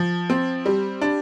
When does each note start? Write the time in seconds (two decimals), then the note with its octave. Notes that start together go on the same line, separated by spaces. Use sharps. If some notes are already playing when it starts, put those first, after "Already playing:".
Already playing: F3
0.30 C4
0.66 G3
1.01 D4